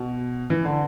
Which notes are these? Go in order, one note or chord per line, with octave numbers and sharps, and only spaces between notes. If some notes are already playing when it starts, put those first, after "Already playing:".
Already playing: B2
E3
D3